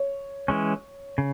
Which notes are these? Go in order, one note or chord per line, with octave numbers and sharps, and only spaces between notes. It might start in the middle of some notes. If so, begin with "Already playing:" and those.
Already playing: C#5
E3 G#3 C#4
C#3